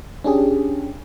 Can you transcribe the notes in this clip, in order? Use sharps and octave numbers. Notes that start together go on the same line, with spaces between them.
C#4 D4 G4 G#4